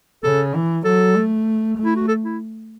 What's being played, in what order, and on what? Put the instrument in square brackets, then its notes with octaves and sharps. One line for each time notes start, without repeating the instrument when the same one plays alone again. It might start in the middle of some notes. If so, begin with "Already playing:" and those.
[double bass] C#3 [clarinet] A4
[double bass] E3
[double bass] F#3 [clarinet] A4
[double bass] A3
A3
[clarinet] E4
F#4
A4
E4